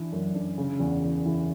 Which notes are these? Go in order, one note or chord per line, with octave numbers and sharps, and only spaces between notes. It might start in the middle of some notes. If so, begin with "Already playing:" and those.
Already playing: E3 D4
F#2
D4
C#3
E2
E2
E3